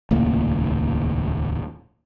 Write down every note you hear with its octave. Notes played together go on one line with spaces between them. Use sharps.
D#1 C#2 A2 A#3